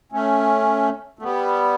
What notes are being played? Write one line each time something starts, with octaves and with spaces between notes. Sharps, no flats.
A3 C#4
A3
G3 B3